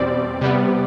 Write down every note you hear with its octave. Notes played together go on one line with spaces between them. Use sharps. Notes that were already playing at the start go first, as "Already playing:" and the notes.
Already playing: E2 B2 G3 C4 D5
C3 G3 B3